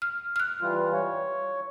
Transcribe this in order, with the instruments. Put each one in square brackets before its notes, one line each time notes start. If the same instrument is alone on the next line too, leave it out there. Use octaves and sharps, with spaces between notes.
[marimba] F6
F6 F#6
[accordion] E3 G3 F4
C#5